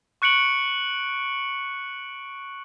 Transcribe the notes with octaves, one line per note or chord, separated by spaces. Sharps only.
C#6 F#6 C#7 D7 F#7